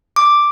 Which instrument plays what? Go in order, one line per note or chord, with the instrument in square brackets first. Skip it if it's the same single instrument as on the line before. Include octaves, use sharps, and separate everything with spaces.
[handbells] D6